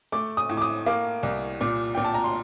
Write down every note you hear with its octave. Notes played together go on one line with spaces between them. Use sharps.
A3 D6
D#6
A2
D6
D#6
A#3 D6
C2
A#2
A#2 G5
A5
A#5
C6